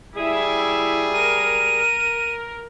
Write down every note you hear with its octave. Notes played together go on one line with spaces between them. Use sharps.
G3 E4 G#4 E5
A#4 D#7